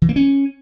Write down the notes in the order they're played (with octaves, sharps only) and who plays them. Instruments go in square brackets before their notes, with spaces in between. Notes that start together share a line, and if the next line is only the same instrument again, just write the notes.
[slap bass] E3
A#3
C#4